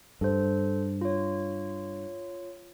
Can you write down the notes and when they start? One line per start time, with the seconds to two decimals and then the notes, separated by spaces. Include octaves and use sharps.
0.21 G2 A4 C5
1.01 F4 C#5